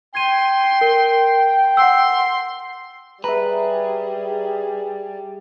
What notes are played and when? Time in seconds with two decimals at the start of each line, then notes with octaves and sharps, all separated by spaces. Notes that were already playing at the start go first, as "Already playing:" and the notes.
0.15 G5 C6 G#6 D#7
0.81 A#4
1.77 F#5 C6 E6
3.24 G3 G#4 B4 E5 A#5